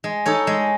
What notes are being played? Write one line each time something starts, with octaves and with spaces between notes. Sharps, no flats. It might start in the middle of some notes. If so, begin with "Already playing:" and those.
G#3
D#4 A4 C#5
G#3